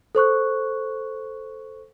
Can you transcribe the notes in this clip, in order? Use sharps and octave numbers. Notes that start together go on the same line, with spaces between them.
A4 C5 C#6 F#6